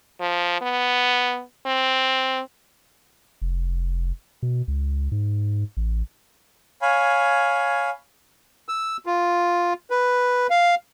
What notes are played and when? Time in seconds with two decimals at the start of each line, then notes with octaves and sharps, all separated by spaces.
0.20 F3
0.61 B3
1.66 C4
3.42 F1
4.43 B2
4.68 C#2
5.12 G#2
5.77 A1
6.82 C#5 F5 G#5 B5
8.68 E6
9.06 F4
9.90 B4
10.50 F5